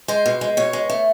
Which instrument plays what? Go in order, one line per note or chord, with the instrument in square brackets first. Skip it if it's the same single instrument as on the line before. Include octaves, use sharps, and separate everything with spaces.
[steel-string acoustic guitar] G#3 C5
B2
G#3
B2 C#5
G#3
A3